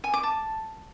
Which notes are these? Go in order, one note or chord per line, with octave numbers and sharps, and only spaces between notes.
G#5
D6
A5